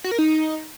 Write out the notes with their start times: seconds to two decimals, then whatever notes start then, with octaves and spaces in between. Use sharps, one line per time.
0.04 F#4
0.11 A#4
0.18 D#4